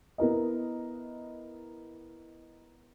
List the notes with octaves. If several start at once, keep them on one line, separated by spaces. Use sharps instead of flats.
B3 E4 A#4 D#5